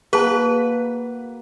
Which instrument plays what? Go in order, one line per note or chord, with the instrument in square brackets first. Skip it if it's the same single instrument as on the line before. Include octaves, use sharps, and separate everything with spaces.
[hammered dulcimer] A#3 F#4 [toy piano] G#4 A5 [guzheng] B4